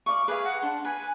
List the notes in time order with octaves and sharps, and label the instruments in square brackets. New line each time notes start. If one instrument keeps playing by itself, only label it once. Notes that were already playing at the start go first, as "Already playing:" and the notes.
[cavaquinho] D5 F5 C#6
[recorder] G#4 [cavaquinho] B4 F5
[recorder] F#5
[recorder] D4 [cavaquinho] C6
[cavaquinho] B4 [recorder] G#5